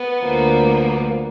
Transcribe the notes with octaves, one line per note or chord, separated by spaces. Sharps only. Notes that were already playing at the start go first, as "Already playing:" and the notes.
Already playing: B3
D2 D3 F3 A#3